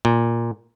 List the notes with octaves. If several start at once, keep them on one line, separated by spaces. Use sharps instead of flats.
A#2